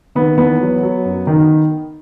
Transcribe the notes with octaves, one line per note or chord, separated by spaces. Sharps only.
D#3 B3
E2 B3
F#3
F#3
F#2
D#3